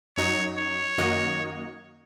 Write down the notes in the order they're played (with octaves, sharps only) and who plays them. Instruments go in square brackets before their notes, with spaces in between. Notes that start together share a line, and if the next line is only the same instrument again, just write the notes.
[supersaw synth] F#2 F#3 D#4 [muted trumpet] C#5
[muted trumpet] C#5
[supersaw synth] F#2 D#3 A#3 F#4 D#5